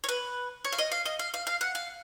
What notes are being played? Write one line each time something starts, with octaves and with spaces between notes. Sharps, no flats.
C#5
B4
C#5
F5
D#5
F5
D#5
F5
F5
F5
F#5
F5